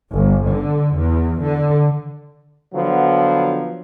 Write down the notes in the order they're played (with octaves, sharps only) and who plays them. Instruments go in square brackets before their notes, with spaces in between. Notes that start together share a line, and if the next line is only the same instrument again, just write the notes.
[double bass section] G1
D3
E2
D3
[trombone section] D3 F3 F#3 B3